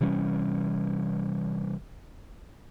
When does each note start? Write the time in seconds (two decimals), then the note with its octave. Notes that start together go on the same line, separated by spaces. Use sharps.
0.01 C3 E3 G3 C#4